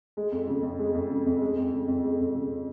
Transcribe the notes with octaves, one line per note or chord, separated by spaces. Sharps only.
G#3
F2
C#3
F2
G#3
F2
C#3
F2
G#3
F2
C#3
F2
G#3
F2
C#3